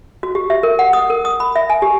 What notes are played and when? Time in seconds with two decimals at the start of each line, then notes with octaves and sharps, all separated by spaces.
0.23 F#4
0.35 G4
0.50 E5
0.63 A#4
0.79 F#5
0.93 D#6
1.10 A#4
1.25 D#6
1.40 B5
1.56 E5
1.70 G#5
1.82 G4